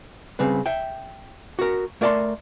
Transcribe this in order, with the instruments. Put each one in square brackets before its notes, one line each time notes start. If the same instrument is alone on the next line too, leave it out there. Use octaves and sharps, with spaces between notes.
[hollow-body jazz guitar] C#3 G3 C4 B4
E5 G5
F#4 A#4
A3 A#4 D5 F5 A5 C6